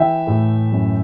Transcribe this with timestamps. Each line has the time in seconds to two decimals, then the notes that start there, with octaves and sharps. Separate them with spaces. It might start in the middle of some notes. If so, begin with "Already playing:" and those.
Already playing: E3 E5 G5
0.27 A2
0.72 F#2